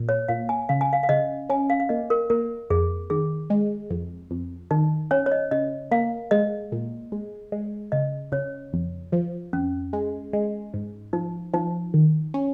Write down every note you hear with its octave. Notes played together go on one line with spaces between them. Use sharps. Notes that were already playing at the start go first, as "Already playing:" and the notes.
Already playing: A#2
C#5
A#2 F5
G#5
C#3 F5
G#5
F5
F5
C#3 D#5
C#4 G#5
F5
F5
A#3 D#5
A#4
A#3 A#4
F2 G#4
D#3 G#4
G#3
F2
F2
D#3 D#4
C#4 C#5
C#5
D#5
C#3 D#5
A#3 F5
G#3 D#5
A#2
G#3
G#3
C#3 D#5
C#3 C#5
F2
F3
F2 C#4
G#3
G#3
G#2
F3 D#4
F3 D#4
D#3
C#4